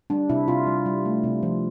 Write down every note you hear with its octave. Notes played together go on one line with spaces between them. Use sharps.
G3 D4
C3 E4
C3 F4
G3
G3
A3
C3
F3